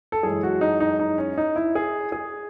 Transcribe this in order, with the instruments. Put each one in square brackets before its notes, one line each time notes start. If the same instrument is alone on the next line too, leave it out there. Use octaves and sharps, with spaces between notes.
[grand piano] A4
F#2 E3 G#3 G#4
F#4
D#4
D#4
D#4
C#4
D#4
E4
G#4
G#4